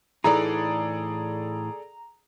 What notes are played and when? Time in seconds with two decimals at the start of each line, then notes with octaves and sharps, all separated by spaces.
0.24 A2 E3 D#4 G#4 A4 D5 A#5